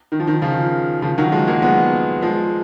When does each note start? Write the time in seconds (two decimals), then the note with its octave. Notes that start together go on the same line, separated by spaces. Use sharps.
0.12 D#3
0.20 F3
0.27 D#3
0.42 C#3 F3
1.02 C#3 F3
1.18 D#3 F#3
1.32 F3 G#3
1.47 F#3 A#3
1.62 G#3 B3
2.22 F3 G#3